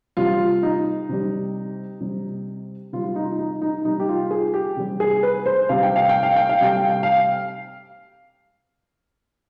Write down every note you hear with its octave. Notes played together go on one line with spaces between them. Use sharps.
C3 G3 F4
D#4
C3 G3
C3 G3
C3 G3 F4
F4
D#4
D#4
D#4
C3 G3 D#4
G4
F4
G#4
G4
C3 G3
G#4
B4
C5
C3 G3 F5
G5
F5
G5
F5
G5
F5
C3 G3 G5
F5
G5
F5